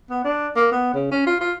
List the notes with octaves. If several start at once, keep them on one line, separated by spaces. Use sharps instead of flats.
B3
D4
A#3
B3
C#3
C#4
F4
F4